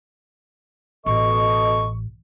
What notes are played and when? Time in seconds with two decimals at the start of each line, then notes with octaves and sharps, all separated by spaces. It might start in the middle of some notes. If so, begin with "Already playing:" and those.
1.06 A1 B2 A4 D#5 C#6